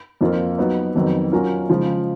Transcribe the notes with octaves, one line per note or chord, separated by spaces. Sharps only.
F2 F3 A#3 F4
F#3 B3 D#4
F2 D#3 F#3 B3
F#3 C#4 F4 A#4
C#3 F3 G#3